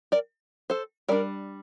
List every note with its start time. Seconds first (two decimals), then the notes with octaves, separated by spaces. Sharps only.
0.12 A#4 D5
0.70 A4 C5
1.09 G3 D4 A#4 D5